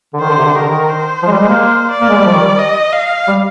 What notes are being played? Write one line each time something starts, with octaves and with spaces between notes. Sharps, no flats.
D3
D#3 C5
D3
C3
D3
D#3 A#4
D3
D#3
C5
F3
G#3
G3
G#3
A#3
D5
A#3
G#3
G3
F3
D#3
G3
D#5
F5
G3